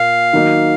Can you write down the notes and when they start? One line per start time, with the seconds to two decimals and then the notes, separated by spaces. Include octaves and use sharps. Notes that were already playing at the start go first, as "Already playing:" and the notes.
Already playing: A#2 F5
0.33 D#3 F#3 A#3 D#4